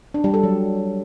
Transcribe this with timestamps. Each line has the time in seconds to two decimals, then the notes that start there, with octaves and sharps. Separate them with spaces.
0.14 D4
0.24 G3
0.34 A4
0.43 F#3